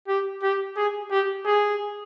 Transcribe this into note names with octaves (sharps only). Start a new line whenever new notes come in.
G4
G4
G#4
G4
G#4